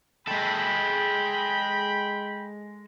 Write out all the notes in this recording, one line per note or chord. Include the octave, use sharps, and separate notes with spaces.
G#3 A4 G5 B5